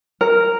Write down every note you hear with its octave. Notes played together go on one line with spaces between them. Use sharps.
A#4